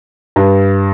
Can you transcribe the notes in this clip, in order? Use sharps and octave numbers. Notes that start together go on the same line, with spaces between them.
G2